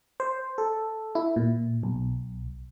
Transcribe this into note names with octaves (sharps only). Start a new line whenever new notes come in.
C5
A4
E4
A#2
B1